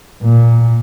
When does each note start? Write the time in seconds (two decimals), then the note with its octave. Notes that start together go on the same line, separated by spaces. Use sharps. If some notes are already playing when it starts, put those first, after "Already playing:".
0.22 A#2